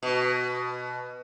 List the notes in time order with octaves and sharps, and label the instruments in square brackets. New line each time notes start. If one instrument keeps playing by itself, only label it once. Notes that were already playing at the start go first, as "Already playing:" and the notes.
[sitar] B2